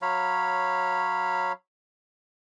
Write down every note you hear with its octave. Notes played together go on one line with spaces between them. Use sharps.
F#3 C#5 F5 B5